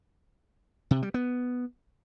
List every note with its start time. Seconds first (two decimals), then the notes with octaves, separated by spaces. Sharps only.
0.91 C3
1.02 G3
1.14 B3